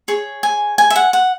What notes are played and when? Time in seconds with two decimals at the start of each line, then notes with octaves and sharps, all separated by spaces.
0.08 G#4 C#5
0.43 G#5
0.78 G#5
0.90 E5
0.96 F#5
1.13 F#5